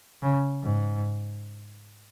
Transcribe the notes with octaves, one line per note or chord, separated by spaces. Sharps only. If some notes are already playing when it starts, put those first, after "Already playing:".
C#3
G#2